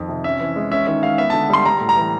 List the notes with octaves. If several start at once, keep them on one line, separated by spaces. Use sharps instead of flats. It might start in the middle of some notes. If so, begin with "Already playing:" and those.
Already playing: F2 D#3 F3
C3
C#4 E5
E3
G#3
C#4 E5
D#3 E5
G#3 F5
B3 E5
D3 A5
G3 C6
G3 A#5
A2
A#5
E3